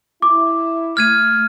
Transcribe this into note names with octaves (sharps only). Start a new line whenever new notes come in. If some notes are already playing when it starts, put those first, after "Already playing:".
E4 D6
A3 F6 G#6 D#7